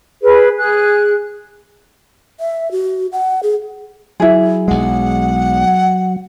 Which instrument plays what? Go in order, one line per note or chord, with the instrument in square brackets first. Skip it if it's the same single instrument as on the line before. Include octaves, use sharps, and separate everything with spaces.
[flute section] G#4 B4
G#4 F#6
[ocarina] E5
F#4
F#5
G#4
[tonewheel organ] F#3 [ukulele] E4 G#4
[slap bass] B1 G#3 [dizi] F#5